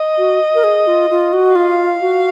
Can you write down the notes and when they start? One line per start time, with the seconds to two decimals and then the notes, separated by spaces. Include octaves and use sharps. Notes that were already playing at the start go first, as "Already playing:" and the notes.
Already playing: D#5
0.18 F#4
0.55 A#4
0.64 G#4
0.87 F4
1.10 F4
1.33 F#4
1.55 F4 F5
2.01 F#4